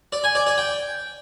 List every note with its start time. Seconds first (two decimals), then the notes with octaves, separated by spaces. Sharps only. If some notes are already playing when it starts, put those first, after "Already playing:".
0.12 D5
0.24 G#5
0.35 D5
0.46 D5
0.58 G5